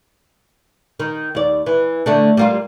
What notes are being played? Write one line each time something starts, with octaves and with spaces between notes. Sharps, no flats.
D#3
D#2 D5
E3
D3 A3 D4
G3 A#3 F4